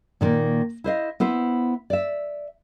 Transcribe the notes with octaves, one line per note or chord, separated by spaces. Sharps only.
A#2 D#3 A#3
E4 C5 D#5 F5
B3 E4 B4 C5
D5 E5